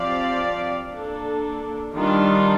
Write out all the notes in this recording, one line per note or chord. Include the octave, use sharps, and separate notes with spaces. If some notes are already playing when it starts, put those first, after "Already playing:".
Already playing: F3 C4 G4 D5 F5
A#3 D4 A4
D#3 G3 D4 F4